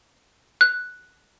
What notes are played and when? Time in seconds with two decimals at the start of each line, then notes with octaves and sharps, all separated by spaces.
0.61 F#6